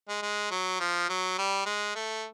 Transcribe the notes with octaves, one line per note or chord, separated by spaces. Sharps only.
G#3
G#3
F#3
F3
F#3
G3
G#3
A3